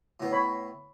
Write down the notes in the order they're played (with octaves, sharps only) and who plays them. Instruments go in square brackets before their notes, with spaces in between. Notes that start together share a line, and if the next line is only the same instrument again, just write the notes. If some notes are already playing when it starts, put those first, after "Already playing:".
[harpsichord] A2 B3
[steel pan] C#5 B5